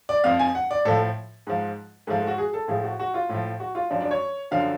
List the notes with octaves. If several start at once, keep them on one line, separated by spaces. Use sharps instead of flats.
D5
F2 F3 F5
G#5
F#5
D5
A2 F3 A4
G#2 F3
G#2 F3 A3
A3
F#4
G#4
A4
A2 F3 G#4
F#4
F#4
F4
A2 F3
F#4
F4
F#2 F3 D4
D4
C#5
F#2 D3 F3 F5